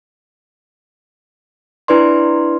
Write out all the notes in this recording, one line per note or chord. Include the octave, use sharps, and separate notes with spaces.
D4 E4 B4 D5 C6